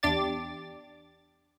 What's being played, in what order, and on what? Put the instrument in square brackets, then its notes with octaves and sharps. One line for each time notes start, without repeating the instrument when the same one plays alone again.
[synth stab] E2 D4 G4 D5 D6 A6